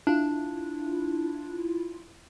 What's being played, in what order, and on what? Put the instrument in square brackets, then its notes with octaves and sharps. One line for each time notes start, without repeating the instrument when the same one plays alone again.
[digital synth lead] D4 [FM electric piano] E4 F4